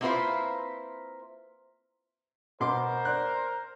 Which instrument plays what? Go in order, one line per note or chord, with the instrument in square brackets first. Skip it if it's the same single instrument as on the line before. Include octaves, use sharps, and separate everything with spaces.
[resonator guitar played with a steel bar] A#3 C4 E4 F4 B4 C5
[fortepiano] B2 C6 D6 [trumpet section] A#4 C5
[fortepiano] D5 F#6